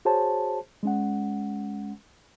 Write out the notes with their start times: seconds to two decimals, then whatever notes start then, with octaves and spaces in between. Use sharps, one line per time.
0.05 F#4 G#4 C5 C#5 A5
0.83 G#3 C#4 F#5